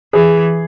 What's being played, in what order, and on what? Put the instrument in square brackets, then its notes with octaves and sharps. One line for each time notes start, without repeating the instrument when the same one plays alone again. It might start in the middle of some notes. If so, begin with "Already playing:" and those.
[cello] E3 [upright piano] G#4